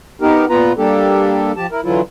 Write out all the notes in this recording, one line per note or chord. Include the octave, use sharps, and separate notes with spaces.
B3 D#4 G4 A#4
A#2 B3 F4 B4 A#5
G3 A#3 D4 G4 A4
F3 G4 A5
E4 A#4
D3 E3 F#3 E4 F4